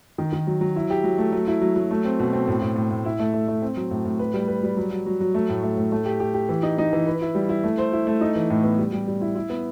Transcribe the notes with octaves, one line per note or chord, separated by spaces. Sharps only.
D#3
D#3
F#3
F#3
E4
G4
F#3
A3
F#3
E4
F#3
F#3
A3
C4
B2
C4
A2
A2
A2
A2
E4
A3
A3
A3
C4
F#3
A2
A2
B4
G3
B4
G3
F#3
F#4
F#3
F#3
A3
A2
A3
A2
A3
G4
G4
G4
E3
D#4
D#4
E3
B4
E4
G3
E4
A3
C5
E4
A3
D#4
E3
A2
B3
G3
G3
G3
E4
E4
B3